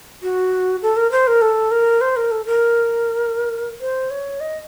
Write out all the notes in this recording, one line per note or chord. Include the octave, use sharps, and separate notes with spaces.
F#4
A4
A#4
C5
A#4
A4
A#4
C5
A#4
A4
A#4
C5
C#5
D#5